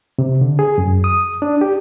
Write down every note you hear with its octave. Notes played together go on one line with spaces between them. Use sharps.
C3
D3
G#4
F#2
D#6
D4
G4